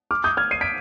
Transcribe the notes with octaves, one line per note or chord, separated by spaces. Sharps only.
D6 F6
D#6 G6
F6 G#6
C7 D#7
B6 D7